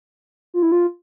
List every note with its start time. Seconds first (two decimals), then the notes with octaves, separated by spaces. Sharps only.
0.54 F4
0.63 E4
0.72 F4